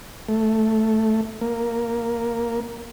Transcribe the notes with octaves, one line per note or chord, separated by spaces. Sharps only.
A3
A#3